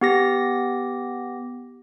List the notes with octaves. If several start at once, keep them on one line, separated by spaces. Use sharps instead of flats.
B3 G4 A#6